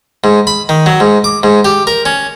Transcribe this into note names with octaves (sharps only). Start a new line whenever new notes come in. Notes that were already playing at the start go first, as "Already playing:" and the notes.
G#2
B5
D#3
F#3
G#2
D6
G#2
G4
A#4
C#4